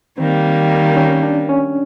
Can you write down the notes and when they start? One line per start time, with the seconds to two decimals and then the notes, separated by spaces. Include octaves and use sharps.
0.18 D#3 G3 A#3 C4
0.97 C#4
1.23 D4
1.49 C#4